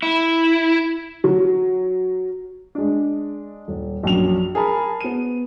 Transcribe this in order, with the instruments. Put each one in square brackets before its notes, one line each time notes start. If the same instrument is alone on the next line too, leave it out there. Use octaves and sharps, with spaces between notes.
[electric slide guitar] E4
[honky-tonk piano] F#3
[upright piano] G#3 D4
D#1
A#1 F#2 F7
G#4 A#4 A5 B5
B3 D#7